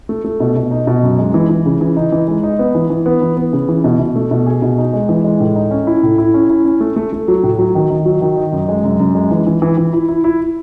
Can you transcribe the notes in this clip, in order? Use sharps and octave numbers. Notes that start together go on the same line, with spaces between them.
A3
A3
B2
B2
D#4
B2
F#2
G#3
E3
E3
C#3
E3
D#4
E3
G#3
D#4
B3
E3
E3
B3
E3
B3
C#3
E3
B2
B2
A3
B2
G#4
B2
D#4
G#3
E3
G#3
A2
D#4
C#4
E4
A2
E4
C#4
E4
C#4
A3
A3
A3
F#3
A2
F#3
D#3
D#3
F#3
D#3
D#4
F#2
G#3
F#2
F#2
G#3
E3
E3
E3
E3
E4
E4
E4